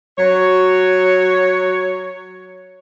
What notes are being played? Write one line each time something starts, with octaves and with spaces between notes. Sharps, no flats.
F#3 C#5